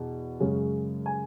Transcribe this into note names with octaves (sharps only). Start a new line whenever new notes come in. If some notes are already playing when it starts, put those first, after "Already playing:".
Already playing: E2 B2
F#2 C#3 G#3 C#4
G#5